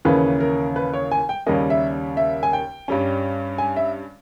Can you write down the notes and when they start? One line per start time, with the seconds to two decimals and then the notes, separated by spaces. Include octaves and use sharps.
0.05 D#2 C#3 E3 A#3 C#4 B4
0.40 A#4
0.76 B4
0.93 C#5
1.11 G#5
1.29 G5
1.46 D#2 C#3 G3 A#3 C#4 D#5
1.70 E5
2.17 E5
2.43 G#5
2.53 G5
2.88 G2 G3 C#4
3.58 G#5
3.76 E5